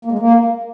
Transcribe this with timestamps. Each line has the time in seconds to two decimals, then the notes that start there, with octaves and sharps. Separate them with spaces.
0.05 A#3
0.12 G#3
0.19 A#3